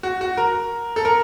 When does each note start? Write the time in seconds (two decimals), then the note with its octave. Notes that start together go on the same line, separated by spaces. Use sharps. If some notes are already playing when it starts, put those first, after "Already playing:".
0.03 F#4
0.21 F#4
0.37 A#4
0.96 A4
1.05 A#4